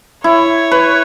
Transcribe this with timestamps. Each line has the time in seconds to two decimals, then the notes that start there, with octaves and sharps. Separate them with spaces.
0.24 E4 C#5
0.71 B4